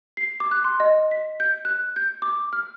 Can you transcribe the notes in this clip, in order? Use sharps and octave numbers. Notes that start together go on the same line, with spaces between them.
C7
D6
F#6
C6
D#5
B6
G6
F#6
G6
D6
F6